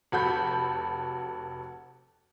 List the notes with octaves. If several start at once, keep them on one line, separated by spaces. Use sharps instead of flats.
F1 F#4 A4 B5 G6